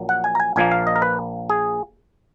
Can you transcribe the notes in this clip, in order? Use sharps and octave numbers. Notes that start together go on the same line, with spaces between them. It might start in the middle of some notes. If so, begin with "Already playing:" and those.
Already playing: A#1 A#2 F#3
F#5
G#5
A#5
G#5
A#1 A#2 F3 A#3 G#5
F5
D#5
A#4
B4
G#4